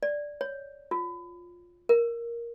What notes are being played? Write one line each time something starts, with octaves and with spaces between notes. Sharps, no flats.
D5
C#5
F4
A#4